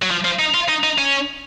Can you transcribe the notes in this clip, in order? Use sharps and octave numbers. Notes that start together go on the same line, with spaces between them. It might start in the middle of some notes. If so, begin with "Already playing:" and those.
F#3
F3
F3
D#4
F4
D#4
D#4
C#4